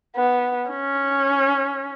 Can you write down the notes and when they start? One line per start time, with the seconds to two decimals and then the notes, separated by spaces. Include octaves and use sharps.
0.16 B3
0.70 C#4